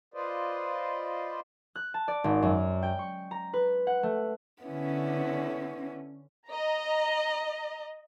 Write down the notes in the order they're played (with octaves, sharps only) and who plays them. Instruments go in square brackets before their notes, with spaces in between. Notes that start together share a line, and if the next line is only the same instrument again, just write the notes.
[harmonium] F4 B4 C5 D5 D#5
[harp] F#6
A5
D5
G#1
F#2
G5
C#6
A#5
B4
F#5
A3
[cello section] D3 C#4 [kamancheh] B3 E4
[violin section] D#5 A#5